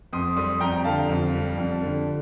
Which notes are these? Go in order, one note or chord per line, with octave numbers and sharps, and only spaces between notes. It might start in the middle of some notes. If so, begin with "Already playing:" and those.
F2 C6 D#6
G3 C6 D#6
F2 G5 A#5
D3 F5 A5
F2
G3
F2
D3